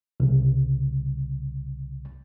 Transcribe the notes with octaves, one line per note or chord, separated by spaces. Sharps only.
C2 C#3